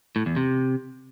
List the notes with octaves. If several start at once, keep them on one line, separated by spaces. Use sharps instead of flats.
A2
E2
C3